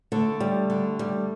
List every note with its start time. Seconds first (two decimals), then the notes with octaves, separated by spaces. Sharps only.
0.12 D3 A3
0.40 G3
0.70 D3
0.99 G3